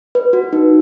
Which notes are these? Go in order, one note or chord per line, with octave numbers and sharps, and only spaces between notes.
B4
F#4
D#4